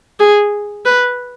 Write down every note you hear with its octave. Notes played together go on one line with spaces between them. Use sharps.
G#4
B4